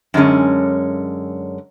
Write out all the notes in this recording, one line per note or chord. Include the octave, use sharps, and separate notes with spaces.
F#2 D3 G#3 C#4